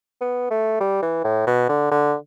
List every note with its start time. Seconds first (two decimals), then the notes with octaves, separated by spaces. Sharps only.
0.21 B3
0.50 A3
0.80 G3
1.02 E3
1.25 A2
1.47 B2
1.69 D3
1.91 D3